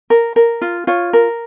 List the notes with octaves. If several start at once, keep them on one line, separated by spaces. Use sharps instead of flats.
A#4
A#4
F4
F4 C#5
A#4